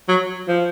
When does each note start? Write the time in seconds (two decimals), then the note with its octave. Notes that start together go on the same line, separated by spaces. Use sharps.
0.09 F#3
0.48 F3